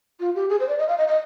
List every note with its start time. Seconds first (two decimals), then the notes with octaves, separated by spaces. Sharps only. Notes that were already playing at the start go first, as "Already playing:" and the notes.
0.20 F4
0.35 G4
0.50 G#4
0.60 C5
0.68 D5
0.78 D#5
0.88 F5
0.98 D#5
1.08 D#5